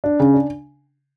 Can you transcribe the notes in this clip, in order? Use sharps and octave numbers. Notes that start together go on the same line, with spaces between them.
D4
C#3
D4